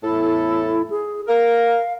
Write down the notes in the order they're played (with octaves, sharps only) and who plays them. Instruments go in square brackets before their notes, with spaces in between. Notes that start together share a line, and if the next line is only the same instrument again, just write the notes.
[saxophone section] E2 A2 A4 [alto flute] E4
[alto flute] G#4
[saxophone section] A#4 [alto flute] F5